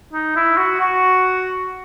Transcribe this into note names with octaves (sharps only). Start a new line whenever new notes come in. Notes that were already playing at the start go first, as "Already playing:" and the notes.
D#4
E4
F#4
F#4